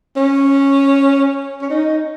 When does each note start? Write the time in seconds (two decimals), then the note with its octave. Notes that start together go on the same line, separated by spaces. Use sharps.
0.17 C#4
1.62 C#4
1.70 D#4